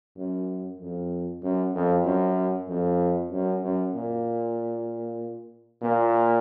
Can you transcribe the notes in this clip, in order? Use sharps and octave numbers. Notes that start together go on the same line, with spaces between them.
F#2
F2
F#2
F2
F#2
F2
F#2
F#2
A#2
A#2